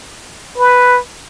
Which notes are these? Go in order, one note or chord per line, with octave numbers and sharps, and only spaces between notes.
B4